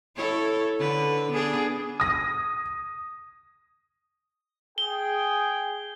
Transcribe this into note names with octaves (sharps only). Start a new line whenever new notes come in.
E4 A4 C#5
D3 B4
B3 D4 G#4
D#6 A#6
G#4 G5 G7